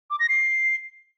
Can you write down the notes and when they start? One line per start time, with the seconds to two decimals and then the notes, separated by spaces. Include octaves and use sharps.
0.11 D6
0.20 A#6
0.29 C7